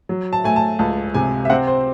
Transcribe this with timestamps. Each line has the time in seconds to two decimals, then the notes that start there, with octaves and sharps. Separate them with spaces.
0.09 F#3
0.33 A5
0.44 A3 G#5
0.56 A5
0.79 C#2 A5
1.14 C3 G#5
1.45 E5
1.50 C4 F#5
1.67 C5